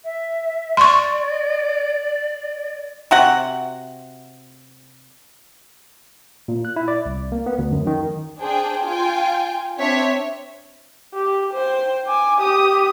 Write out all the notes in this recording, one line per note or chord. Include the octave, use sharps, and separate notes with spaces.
E5
D5 C6 C#6
C3 F#4 F#5
A#2
F#6
E4
D5
C2
A#3
B3
D2
F#2
D#3
D4 G#4 C5 G5
F4 G5 G#5
C4 D4 C#5 E5 B6
G4
C5 G5
G#5 D6
G4 D#6